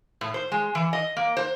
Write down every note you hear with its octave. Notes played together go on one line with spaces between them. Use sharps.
A2
C5
G#3
E3
D#5
A#3
C5